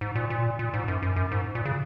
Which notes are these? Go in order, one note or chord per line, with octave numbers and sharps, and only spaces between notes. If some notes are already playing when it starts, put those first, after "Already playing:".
G#2
A#2
A#2
A#2
G#2
F#2
F#2
F#2
G#2
A#2
C#3